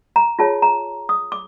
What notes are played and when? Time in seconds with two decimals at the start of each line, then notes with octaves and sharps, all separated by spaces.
0.16 A#5
0.39 F4 G#4 C#5 A5
0.62 A#5
1.09 D#6
1.32 D6